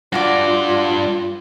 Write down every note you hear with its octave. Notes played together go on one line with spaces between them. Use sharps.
G2 F4 F#4 D5 F5 D6